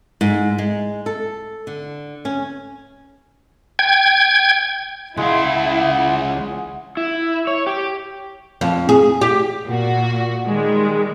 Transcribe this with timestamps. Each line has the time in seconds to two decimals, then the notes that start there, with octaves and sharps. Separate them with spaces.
0.21 G#2
0.58 G#3
1.06 A4
1.67 D3
2.25 C#4
3.79 G5 G#6
5.17 C#2 G#3 E4 F5 F#5
6.97 E4
7.47 C#5
7.67 G4
8.61 F2
8.89 G#4
9.21 G4
9.66 A#2 F#4
10.45 D#3 G3 G#3